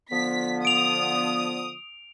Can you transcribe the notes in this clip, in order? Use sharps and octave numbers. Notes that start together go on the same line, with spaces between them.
D3 F3 B3 B6
D#6 D7 F7